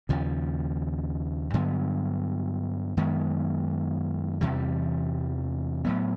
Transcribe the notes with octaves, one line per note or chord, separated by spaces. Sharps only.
D#2 C#3 F3
G2 D3 F#3 B3
F#2 D#3 G#3 B3
E2 C3 E3 G3
A2 F#3 B3